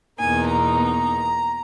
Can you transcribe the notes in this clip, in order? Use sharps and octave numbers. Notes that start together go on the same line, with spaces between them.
E2 B2 A#3 D#4 G#5
A#5